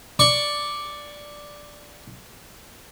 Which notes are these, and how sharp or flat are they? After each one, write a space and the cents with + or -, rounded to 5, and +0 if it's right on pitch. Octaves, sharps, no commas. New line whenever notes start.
D5 +0 C#6 +0